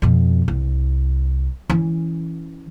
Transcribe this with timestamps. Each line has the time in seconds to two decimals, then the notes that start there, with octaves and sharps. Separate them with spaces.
0.02 F2 B2
0.48 C2
1.70 E3 C#4